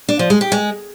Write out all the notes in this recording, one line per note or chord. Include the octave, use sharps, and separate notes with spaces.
D4
F3
G#3
G4
G#3